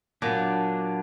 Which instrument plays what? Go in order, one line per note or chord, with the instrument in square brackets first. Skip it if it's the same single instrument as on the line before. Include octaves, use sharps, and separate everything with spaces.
[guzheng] A#2 [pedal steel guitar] F#3 B3 D4